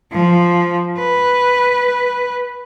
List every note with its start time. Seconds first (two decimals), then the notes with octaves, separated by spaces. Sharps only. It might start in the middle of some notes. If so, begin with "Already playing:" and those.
0.12 F3
0.98 B4